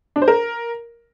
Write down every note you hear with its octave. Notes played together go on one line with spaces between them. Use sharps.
D4
C5
A#4